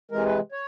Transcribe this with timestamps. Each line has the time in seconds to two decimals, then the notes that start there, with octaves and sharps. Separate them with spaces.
0.11 C3 E3 G#3 A#4
0.25 B4
0.52 C#5